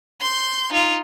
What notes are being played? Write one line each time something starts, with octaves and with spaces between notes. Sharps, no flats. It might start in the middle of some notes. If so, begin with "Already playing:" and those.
C6 G6
D#4 F4